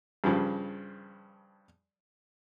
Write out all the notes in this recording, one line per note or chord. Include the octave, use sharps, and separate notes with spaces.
G2 C#3 F3